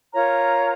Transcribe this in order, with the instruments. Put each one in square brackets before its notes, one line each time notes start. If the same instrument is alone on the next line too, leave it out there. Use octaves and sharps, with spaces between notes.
[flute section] F4 A#4 C#5 A#5